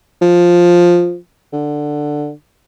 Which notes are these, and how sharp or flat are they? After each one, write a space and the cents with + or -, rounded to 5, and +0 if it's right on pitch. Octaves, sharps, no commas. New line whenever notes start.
F3 +5
D3 +10